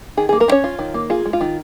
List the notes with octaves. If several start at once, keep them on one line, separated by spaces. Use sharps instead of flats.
D#3 G#4
A#3 G#4
A#3 A#4
D#3
C#4 C#5
F4
D#3
A#3
F4 G#4
G#3
F4
D#3